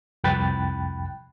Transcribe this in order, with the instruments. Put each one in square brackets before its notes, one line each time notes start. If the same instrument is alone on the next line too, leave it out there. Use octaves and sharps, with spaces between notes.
[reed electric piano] C2 F2 G5 B5 F#6 A6